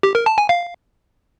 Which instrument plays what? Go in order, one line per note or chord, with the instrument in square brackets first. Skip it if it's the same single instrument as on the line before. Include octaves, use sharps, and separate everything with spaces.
[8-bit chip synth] G4
A#4
A5
G#5
F5